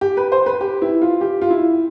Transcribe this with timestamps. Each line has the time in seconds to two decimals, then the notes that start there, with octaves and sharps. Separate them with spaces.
0.01 G4
0.17 B4
0.32 C5
0.46 B4
0.61 G4
0.82 E4
1.02 F4
1.21 G4
1.42 F4
1.50 E4